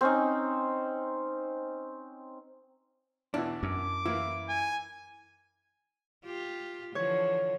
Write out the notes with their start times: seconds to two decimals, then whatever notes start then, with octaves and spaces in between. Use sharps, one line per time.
0.01 C4 C#4 D#4
3.34 E2 B2 E3 D4
3.63 F#2 D6
4.06 E3 A#3 E4
4.49 G#5
6.25 F4 G4
6.95 D3 E3 F3 C#5